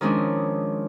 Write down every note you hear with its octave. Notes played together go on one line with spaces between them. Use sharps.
D#3 F3 G#3 C#4 D4